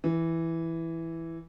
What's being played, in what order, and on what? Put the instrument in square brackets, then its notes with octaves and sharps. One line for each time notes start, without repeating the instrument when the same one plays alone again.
[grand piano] E3